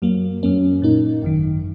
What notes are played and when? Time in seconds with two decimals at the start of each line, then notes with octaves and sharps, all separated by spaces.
0.02 F#2 F#3 A#3
0.43 F#2 F#3 A#3 C#4
0.82 A#2 A#3 D#4
1.22 G#1 F#2 D#3